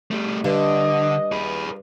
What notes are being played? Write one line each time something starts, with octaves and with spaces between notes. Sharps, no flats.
G3 A3
G2 D3 D4 D#5
G#4 B4